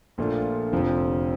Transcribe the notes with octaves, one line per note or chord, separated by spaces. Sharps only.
A#1 A#2 A3 D4 F4
F1 F2 D3 F3 C4